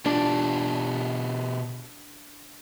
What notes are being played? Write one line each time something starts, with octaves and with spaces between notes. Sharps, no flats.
B2 D4 F4 G4